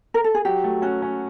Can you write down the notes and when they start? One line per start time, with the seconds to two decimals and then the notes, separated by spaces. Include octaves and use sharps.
0.14 A#4
0.24 A4
0.35 G#4
0.45 F#3 G4
0.64 A3
0.82 C#4 F#4
1.02 C#4